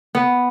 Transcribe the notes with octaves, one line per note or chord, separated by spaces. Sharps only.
B3